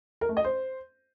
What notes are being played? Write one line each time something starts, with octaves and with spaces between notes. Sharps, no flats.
A#4
A3
D#5
C5